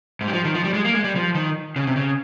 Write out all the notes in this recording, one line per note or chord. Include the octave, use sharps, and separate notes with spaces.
G#2
G3
F3
D#3
F3
G3
G#3
A#3
G#3
G3
F3
D#3
C#3
C3
C#3